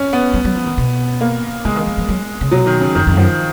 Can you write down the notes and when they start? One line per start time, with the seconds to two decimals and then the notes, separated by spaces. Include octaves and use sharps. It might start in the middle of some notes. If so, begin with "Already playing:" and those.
Already playing: C#4
0.13 B3
0.34 F#3
0.45 F#3
0.56 F3
0.66 D#3
0.78 B2
1.21 A#3
1.65 C#3 G#3
1.76 D#3
1.86 F3
1.98 F3
2.09 F#3
2.41 C#3
2.51 B2 F#3
2.66 D#3
2.81 C#3
2.95 F#2 D#3
3.07 F2
3.17 F#2 F3